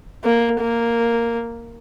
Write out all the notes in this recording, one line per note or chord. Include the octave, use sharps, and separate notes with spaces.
A#3
A#3